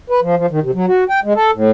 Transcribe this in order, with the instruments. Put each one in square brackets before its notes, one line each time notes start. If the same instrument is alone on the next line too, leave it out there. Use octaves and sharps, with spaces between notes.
[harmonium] B4
F3
F3
D#3
C3
F#3
F#4
G5
G#3
A4
A2